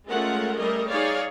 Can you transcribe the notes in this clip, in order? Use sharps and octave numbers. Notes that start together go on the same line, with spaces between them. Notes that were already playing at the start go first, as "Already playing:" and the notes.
G#3 A3 C#4 F4 A#4 F#5
G3 A3 G#4 A#4 D#5
D#4 G#4 C#5 D5 F5